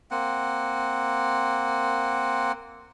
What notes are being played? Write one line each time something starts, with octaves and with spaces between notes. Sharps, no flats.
A#3 C4 F#5